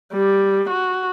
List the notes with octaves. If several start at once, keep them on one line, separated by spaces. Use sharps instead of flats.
G3
F#4